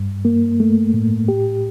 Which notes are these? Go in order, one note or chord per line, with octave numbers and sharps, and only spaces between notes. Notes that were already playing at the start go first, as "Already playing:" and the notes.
Already playing: G2
A#3
A3
A2
G4